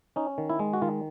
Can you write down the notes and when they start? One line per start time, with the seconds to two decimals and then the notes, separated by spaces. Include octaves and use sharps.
0.16 C#4 D#4
0.38 D#3
0.50 E4
0.59 G#3
0.73 F#4
0.82 D#3 F4